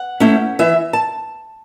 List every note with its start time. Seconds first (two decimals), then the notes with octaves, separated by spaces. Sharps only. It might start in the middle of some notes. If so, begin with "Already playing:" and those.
Already playing: F#5
0.20 A3 C#4 E4
0.59 E3 E5
0.93 A5